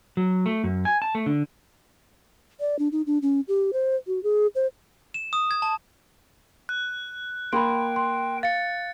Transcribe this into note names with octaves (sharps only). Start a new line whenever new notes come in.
F#3
A3
F#2
G#5
A5
A3
D3
D5
D4
D#4
D4
C#4
G4
C5
F#4
G#4
C5
E7
D#6
G#6
A5
F#6
A#3 G5 B5 C6
C6
F5 A6 C#7